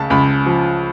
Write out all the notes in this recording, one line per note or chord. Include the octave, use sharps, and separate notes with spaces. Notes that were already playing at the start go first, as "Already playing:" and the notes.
Already playing: C#2 C#3 A5
C#2 B5
F3